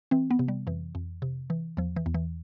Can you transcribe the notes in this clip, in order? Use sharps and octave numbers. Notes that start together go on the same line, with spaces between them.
E3 C4
B3
C3
G3
F2 E3
F2
C3
E3
E2 F3
E3
E2
E3